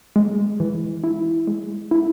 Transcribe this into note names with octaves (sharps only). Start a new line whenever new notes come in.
G#3
E3
E4
G#3
E4